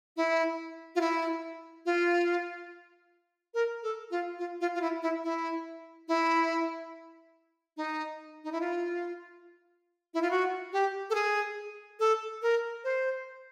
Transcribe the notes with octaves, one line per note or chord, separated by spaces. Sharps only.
E4
F4
E4
F4
A#4
A4
F4
F4
F4
F4
E4
E4
E4
E4
D#4
D#4
E4
F4
E4
F4
F#4
G4
A4
G#4
A4
A#4
C5